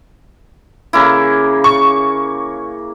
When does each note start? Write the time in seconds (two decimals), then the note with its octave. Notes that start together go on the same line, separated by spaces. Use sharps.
0.93 C#3 A#3 E4
1.64 C#6